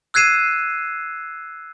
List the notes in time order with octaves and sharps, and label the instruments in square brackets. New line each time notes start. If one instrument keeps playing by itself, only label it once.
[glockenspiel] E6 F#6 G#6 C7 D#7 E7